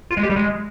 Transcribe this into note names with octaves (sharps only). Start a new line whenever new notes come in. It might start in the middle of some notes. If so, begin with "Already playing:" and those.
F4
G#3
G4
G3
G#3